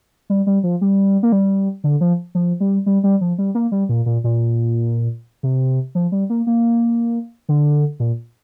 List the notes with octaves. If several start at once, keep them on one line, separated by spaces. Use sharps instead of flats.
G3
G3
F3
G3
A#3
G3
D3
F3
F3
G3
G3
G3
F3
G3
A#3
G3
A#2
A#2
A#2
C3
F3
G3
A#3
A#3
D3
A#2